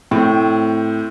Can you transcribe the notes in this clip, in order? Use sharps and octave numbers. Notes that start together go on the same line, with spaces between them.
A2 C4